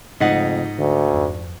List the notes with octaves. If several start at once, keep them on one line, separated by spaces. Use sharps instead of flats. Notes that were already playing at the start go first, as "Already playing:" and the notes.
F2 G#2 C#3 G#3 A3 D#4 D#5 F#5
D2 D3
F2